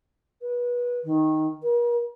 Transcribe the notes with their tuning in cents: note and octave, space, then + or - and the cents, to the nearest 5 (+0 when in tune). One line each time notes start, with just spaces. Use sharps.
B4 -25
D#3 +5
A#4 +40